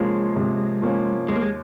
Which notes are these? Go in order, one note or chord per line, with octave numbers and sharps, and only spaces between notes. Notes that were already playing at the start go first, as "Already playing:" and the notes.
Already playing: C3 F3 G#3 A#3 C#4
C3
F3 A#3 C#4
D#2 G#3
A#3
G#3